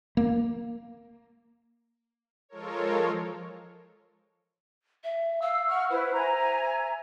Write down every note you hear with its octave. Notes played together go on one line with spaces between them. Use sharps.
A#3
F3 G#3 F4 A4 A#4 C#5
E5
F5 E6
F#5 C#6 F6
E4 B4 C5
E5 G#5 A#5